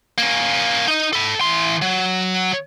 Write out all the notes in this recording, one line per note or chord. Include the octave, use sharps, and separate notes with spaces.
A#3 C#4
D#4 D#5
A4 B5
E3 C6
F#3